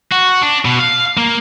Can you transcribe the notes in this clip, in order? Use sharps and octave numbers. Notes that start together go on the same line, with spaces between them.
F#4
D4
B2
F5
A#3